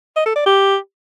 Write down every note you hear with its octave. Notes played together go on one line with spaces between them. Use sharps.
D#5
A4
D5
G4